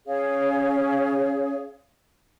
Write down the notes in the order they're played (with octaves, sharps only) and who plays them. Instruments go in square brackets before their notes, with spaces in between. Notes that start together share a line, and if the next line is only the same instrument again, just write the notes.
[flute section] C#4 G#4 C#5 F5